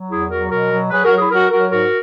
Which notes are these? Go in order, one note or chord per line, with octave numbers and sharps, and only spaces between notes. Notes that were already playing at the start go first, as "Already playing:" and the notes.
Already playing: F#3
E2 E4 G#4
F#3 F#4 A#4
B2 F#4 A#4
F#3
F#3 G#4 B4
F#4 A#4
F#3
E4 G#4
F#3 F#4 A#4
F#3 F#4 A#4
G#2 F#4 A#4